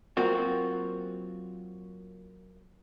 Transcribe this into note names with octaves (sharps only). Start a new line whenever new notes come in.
F#3 A#3 C4 F4 F#4